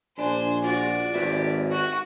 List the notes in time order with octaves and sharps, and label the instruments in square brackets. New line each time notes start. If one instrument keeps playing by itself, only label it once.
[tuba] A#1 [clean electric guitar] D4 [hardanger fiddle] C5 G#5
[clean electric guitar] F4 F#4 [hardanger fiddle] D5
[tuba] G#1 [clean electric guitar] G4 B4 E5
[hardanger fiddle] F#4